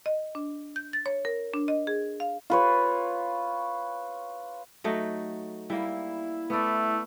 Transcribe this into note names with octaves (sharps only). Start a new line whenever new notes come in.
D#5
D4
G6
A6
C#5
A#4
D4
D#5
G#4
F5
F4 B4 C#5
F#3 A3 D#4
G3 A#3 E4
A3 B3 D5